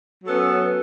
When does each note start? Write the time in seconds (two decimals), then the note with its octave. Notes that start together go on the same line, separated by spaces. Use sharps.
0.22 F#3
0.25 A4
0.27 B3
0.30 C#4